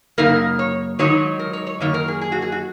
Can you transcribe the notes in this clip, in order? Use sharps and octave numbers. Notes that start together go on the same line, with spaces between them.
F#2 C#3 A#3 D#4 A#4
C#5
G#2 D#3 F#3 D#4 C#5
A#4
C#5
C#5
F#2 D#3 A#3 C#5
A#4
G#4
G#4
F#4
G#4
F#4